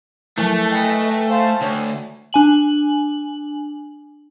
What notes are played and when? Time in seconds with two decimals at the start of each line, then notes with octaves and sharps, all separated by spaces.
0.38 F3 F#3 A3 E4
0.72 B4 D#5 G5 G#5
1.30 C5 F5 A5
1.61 D2 C#5
2.33 D4 G#5 F#7